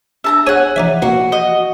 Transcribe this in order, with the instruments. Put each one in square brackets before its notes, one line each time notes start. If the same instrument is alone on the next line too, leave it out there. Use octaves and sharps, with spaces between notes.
[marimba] D4 [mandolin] E5 A5 A#5
[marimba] G#4 [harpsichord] C#5 D#6 [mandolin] F#5 G#5
[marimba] E3 F3 [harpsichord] D#4 D5 E5
[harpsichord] A#3 [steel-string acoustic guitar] F#4
[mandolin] D#5